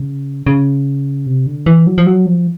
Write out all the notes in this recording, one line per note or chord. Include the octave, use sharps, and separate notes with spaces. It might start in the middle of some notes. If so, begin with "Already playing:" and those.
Already playing: C#3
C#3
C3
D3
E3
F#3
F3
F#3
F3